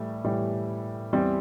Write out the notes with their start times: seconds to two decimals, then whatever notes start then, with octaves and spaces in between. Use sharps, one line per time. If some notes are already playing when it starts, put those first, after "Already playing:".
Already playing: A2 E3 G3 A3
0.25 A2 E3 G3
1.13 E2 E3 G3 C4